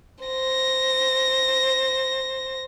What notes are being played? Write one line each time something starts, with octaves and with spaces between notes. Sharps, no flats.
C5 A#6